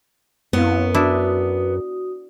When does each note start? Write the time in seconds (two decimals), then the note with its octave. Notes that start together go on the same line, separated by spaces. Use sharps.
0.53 F#2 B3 C4 E4 F5
0.94 D4 E4 F#4 D#6